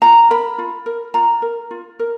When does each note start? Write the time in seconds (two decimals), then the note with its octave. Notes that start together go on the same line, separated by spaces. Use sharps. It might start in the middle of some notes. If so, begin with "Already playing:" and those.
0.02 F4 A#5
0.30 A#4 B5
0.58 F4
0.86 A#4
1.14 F4 A#5
1.42 A#4
1.71 F4
1.99 A#4